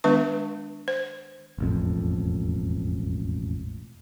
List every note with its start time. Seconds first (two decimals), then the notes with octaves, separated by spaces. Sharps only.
0.04 D#3 G#3 B3 D4 B4 C#6
0.88 C5
1.58 E1 A1 F2